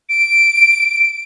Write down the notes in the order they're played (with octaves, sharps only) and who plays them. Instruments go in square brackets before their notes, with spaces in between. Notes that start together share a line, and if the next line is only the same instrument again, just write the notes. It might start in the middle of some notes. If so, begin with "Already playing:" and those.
[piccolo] D7